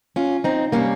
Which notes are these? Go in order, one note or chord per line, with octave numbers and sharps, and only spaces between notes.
C#4 F4
C4 D#4
C3 G3 A#3 C#4